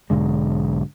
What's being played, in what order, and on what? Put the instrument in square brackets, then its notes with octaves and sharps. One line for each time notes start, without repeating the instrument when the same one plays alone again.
[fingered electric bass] B1 G#2 D3 G#3